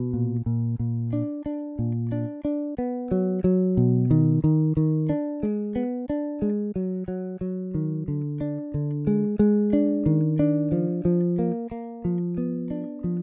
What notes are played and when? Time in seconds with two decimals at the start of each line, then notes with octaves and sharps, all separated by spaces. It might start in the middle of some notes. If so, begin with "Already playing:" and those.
Already playing: B2
0.13 A#2
0.46 A#2
0.79 A#2
1.13 D4
1.46 D4
1.79 A#2
2.12 D4
2.45 D4
2.78 B3
3.11 F#3
3.44 F#3
3.77 B2
4.11 D#3
4.44 D#3
4.77 D#3
5.09 D4
5.43 G#3
5.76 B3
6.10 D4
6.42 G#3
6.76 F#3
7.08 F#3
7.41 F#3
7.74 D#3
8.08 D3
8.41 D4
8.74 D3
9.07 G#3
9.39 G#3
9.73 D4
10.06 D#3
10.39 D4
10.72 F3
11.05 F3
11.39 A#3
11.71 A#3
12.05 F3
12.38 B3
12.71 D4
13.04 F3